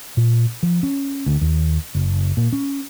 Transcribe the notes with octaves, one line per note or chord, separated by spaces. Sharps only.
A#2
F3
C#4
D2
D#2
F#1
A#2
C#4